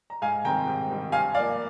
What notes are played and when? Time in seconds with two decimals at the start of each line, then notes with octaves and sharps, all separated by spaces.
0.10 A#5
0.22 G#2 F5 G#5
0.45 D#3 G3 C4 G5 A#5
0.67 G#2
0.90 D#3 G3 C4
1.12 G2 F5 G#5
1.35 F3 A#3 D5 F5